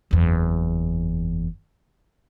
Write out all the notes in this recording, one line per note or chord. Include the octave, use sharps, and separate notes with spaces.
F#1 E2